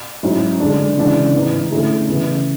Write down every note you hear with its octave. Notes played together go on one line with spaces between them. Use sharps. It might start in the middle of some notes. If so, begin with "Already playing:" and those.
G#2 F#3 C#4 E4
D3 G#3 D4
C#3 E3 G#3 D4
G#2 E3 B3
D3 A3 C#4 E4
C#3 E3 B3 E4